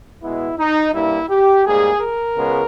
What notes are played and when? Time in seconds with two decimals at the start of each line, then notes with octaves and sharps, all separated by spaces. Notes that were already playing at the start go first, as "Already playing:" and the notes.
0.23 B2 G#3 B3 E4
0.59 D#4
0.94 G2 G3 A#3 E4
1.30 G4
1.65 G#2 G3 A#3 G#4
2.01 A#4
2.36 C#2 C#3 G#3 B3